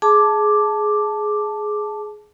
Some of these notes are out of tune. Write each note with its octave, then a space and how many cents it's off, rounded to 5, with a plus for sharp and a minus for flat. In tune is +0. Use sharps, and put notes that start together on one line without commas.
G#4 +15 A5 -5 D6 +0